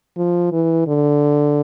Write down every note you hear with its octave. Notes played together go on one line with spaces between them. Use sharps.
F3
E3
D3